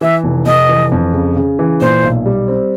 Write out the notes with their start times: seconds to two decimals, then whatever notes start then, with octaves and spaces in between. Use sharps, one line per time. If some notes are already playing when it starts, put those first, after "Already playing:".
0.01 E3 E5
0.24 F1
0.46 F1 D#5
0.69 E3
0.92 F2
1.13 C#3
1.37 C#3
1.59 E3
1.81 A#2 C5
2.03 B1
2.26 G3
2.48 C4